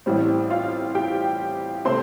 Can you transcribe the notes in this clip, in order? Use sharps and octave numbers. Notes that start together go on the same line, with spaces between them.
A1 A2 G3 C4
F4 F5
G4 G5
C3 A3 C4 C5 C6